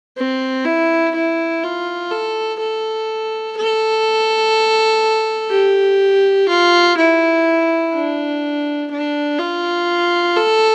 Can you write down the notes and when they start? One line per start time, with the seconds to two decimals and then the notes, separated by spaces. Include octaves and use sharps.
0.17 C4
0.65 E4
1.15 E4
1.63 F4
2.11 A4
2.60 A4
3.57 A4
5.51 G4
6.48 F4
6.97 E4
7.93 D4
8.91 D4
9.39 F4
10.36 A4